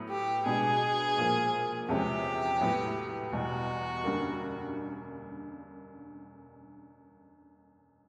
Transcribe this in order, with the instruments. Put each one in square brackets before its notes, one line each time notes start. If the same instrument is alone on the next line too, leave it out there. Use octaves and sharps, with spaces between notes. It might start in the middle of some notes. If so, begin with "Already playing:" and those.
Already playing: [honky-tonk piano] A2 F#3 B3
[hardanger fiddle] G4
[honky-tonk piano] B2 G#3 B3 D4 F#4 [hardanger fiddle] G#4
[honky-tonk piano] A#2 F3 A#3
[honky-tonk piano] E2 C3 F3 G#3 C#4 [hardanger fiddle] G4
[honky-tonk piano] A2 F#3 B3
[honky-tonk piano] E2 B2 G3 [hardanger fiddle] F#4
[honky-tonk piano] F#2 D3 G3 A#3